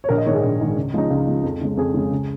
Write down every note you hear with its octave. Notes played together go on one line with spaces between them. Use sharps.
C#5
A#1 A#4
D#5
G#2 D#3 G#3 C#5
G#4
A#1
G#2 D#3 G#3
C#2
C#3 F3 G#3 D#4
C#2 F4
C#3 F3 G#3
F2
C#3 G#3
F2 G#4
C#3 G#3
C#2